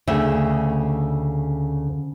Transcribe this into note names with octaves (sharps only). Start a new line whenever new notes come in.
D2 C#3 E5